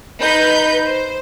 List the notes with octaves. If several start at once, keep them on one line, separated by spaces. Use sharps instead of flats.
D#4 B4 G6
C5